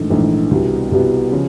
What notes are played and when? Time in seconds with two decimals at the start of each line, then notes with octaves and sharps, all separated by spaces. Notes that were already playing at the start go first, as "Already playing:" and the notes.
Already playing: A#1 G#2 E3 A3
0.10 A#1 G#2 E3 A3
0.51 C2 B2 G3 B3 E4
0.92 C2 B2 G3 B3 E4
1.32 C#3 F3